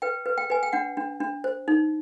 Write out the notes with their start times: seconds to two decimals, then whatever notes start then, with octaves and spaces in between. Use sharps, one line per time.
0.02 B4 G5
0.26 B4
0.38 G5
0.50 B4 G#5
0.63 G5
0.73 D4 F#5
0.97 D4
1.20 D4
1.44 C5
1.68 D#4